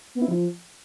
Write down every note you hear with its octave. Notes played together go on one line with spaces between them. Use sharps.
B3
E4
F3